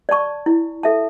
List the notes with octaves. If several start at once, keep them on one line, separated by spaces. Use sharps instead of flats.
D5 A5 C#6
E4
A4 E5 A5